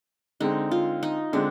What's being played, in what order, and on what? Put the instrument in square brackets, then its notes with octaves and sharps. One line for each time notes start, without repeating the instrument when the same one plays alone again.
[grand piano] D3 G#3 C4 [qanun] D#4
[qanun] F4
D#4
[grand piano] D3 G#3 C4 [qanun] D4